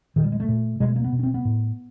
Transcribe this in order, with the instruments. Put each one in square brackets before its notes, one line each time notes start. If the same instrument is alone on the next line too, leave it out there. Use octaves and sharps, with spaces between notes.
[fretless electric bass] A#2 D#3
G3
G#3
A3
A#2
B2 G#3
A3
A#3
B3
B2
C#4
C4
B3
A2